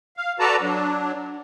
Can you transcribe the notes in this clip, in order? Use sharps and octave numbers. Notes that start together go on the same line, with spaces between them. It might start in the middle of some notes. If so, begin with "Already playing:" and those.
F5
F#4 A4 B4 D5 A5 A#5
F#3 D4